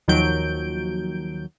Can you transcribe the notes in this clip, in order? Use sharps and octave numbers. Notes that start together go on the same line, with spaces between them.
D#2 D#3 F3 F#3 G6 D7